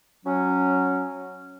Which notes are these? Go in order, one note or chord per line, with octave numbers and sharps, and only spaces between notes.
F#3 C#4